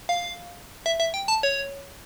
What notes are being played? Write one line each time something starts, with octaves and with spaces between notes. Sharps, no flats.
F5
E5
E5
G5
A5
C#5